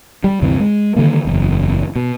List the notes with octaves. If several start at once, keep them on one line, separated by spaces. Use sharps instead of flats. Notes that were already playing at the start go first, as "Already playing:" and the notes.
G3
D2 G2 C3 E3
G#3
D3 D#3 G3 A#3
F#1 E2
B2